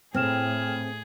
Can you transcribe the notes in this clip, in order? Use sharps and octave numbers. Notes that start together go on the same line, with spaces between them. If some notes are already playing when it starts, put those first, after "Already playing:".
A2 C4 G#4 G5 F6 E7